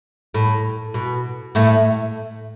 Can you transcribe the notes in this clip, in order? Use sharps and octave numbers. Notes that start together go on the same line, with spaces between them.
A2
B2
A2 A3